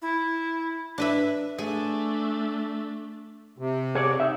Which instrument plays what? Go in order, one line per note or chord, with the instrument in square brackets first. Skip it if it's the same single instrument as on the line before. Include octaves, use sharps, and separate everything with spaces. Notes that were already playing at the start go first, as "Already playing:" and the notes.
[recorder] E4
[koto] D4 B4 E5
[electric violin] A3 D4 [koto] G#4 G#5
[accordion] C3
[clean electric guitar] G#4 C#5 D5
D#4 E5